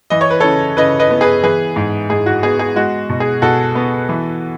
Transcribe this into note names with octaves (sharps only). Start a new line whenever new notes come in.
E3 D#5
C#5
B4
C#3 A4 C#5
C#3 B4 D#5
B4 D#5
B3
G#4 B4
E3 G#4 B4
G#2
G#2 G#4
F#4
B3 G#4
G#4
G#3 F#4
B2
G#4
B2 F#4 A4
B3
E3